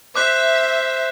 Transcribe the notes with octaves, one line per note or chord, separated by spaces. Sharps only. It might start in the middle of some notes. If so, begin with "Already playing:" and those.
C5 E5 D6 F#6